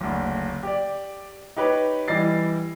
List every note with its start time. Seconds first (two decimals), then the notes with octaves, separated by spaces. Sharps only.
0.01 F#1 D2
0.63 G4 D5
1.57 D#4 G4 B4 C#5
2.08 E3 G3 D#5 A6 C7